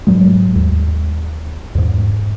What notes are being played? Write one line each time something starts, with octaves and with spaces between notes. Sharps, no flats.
G#2 F#3 G#3
D#2
E2 G#2